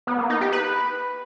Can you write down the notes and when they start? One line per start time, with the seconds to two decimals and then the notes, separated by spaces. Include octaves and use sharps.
0.07 B3
0.18 A#3
0.30 D#4
0.41 G4
0.52 B4